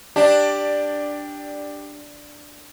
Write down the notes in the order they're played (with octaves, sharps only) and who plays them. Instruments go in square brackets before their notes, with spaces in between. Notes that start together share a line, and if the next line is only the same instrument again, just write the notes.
[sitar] D4 [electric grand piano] G4 D5